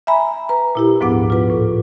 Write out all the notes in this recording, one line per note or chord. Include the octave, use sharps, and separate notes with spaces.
E5 G#5 A#5 B5
B4 A#5
A#2 E4 G4
D2 G#2 F3 B3 F#5 D6
F4 B4
A2